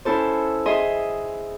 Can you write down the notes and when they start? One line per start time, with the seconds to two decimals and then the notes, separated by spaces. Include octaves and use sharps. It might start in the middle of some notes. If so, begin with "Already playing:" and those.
0.05 C#4 E4 A4 C5
0.66 G#4 D#5 E5 C6